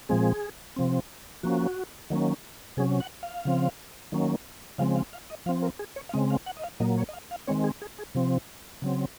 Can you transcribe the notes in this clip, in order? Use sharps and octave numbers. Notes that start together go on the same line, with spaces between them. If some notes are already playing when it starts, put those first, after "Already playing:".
A#2 F3 G#3 C4 G#4
C3 F3 C4
F3 A#3 C#4 F#4
D#3 F#3 A#3 C#4
C3 F#3 C#4 G#4
F#5
F5
C#3 F3 C4
D#3 F#3 A#3 C#4
C#3 F3 G#3 C4 F5
F5
F5
D#5
F3 C4 F5
A#4
G#4
C#5
F5
C#3 G#3 C4 D#5
F5
F#5
D#5
F5
A#2 F#3 A#3 D#5
C#5
D#5
F5
F5
D#3 G#3 C4 C#5
G#4
G#4
G#4
C3 F3 C4
C#3 F#3 C4